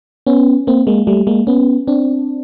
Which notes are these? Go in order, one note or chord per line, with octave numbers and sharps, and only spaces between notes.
B3 C#4
A#3 C4
G#3 A#3
G3 A3
G#3 A#3
B3 C#4
C4 D4